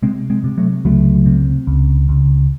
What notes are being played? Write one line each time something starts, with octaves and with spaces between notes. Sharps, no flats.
C3 G#3 C4
G#3 C4
C3
F#3 A3
C#2 F#3 A3
C3
C#2
C#2